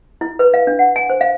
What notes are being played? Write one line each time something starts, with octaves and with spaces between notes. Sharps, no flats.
E4
B4
F5
D4
F#5
G#5
C5
F5